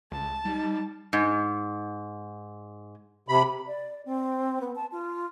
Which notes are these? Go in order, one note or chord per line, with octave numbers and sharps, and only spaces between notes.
C#2 A5
G3 D#4
G#2
C3 B5
D5
C4
B3
A5
F4